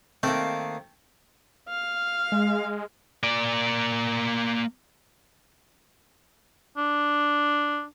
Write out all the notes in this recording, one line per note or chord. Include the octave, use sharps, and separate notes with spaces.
D#3 A3 A#3 C4
F5
G#3
A#3 D5
D4